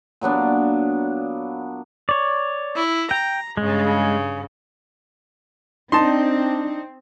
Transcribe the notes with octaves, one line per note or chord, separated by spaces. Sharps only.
A#2 F#3 B3 D4
C#5 D5
E4
G5 A#5
G2 C#3 G#3
C4 D4 D#4 A5 C6